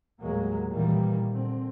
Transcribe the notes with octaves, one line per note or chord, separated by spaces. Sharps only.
D#2 A2 F#3 G#3 A#3
A#2 D#3 E3 G3 A#3
A#2 D3 C4